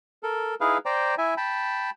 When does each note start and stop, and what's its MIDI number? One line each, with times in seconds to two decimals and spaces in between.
0.23 0.55 69
0.23 0.55 70
0.61 0.78 63
0.61 0.78 64
0.61 0.78 68
0.61 0.78 71
0.61 0.78 77
0.86 1.15 72
0.86 1.15 74
0.86 1.15 79
0.86 1.15 82
1.18 1.34 64
1.18 1.34 76
1.18 1.34 80
1.37 1.90 79
1.37 1.90 81
1.37 1.90 83